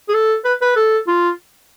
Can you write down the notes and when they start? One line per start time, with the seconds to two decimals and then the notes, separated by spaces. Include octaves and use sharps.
0.09 G#4
0.14 A4
0.44 B4
0.62 B4
0.76 A4
1.08 F4